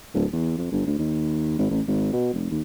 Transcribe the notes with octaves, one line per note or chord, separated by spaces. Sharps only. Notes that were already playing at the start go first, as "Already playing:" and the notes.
D1
E2
F2
G1
D2
D#2
G#1
A1
G#1
B2
F1
D#2